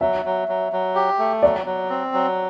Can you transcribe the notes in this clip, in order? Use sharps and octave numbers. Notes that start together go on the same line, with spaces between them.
F#3 E5
F#3
F#3
F#3
G4
A3
F#3 D5
F#3
C4
F#3